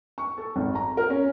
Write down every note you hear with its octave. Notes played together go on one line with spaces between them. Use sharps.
C#6
A4
G#1
A#5
A#4
C#4